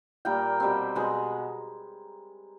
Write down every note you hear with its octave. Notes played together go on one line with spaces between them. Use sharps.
A#2 G3 A#3 G5
B2 G3 C4
B2 G#3 B3